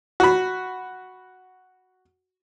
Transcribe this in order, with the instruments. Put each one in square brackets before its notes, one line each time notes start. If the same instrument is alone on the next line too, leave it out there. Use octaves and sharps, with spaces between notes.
[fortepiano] F#4 B5